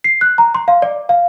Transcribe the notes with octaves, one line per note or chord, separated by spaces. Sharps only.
C7
F#6
A#5
C6
F5
D5
F5